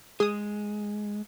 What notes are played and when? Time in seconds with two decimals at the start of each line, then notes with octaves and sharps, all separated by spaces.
0.20 G#3 G#4 D#6